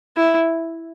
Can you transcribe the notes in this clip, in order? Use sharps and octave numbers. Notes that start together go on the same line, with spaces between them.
E4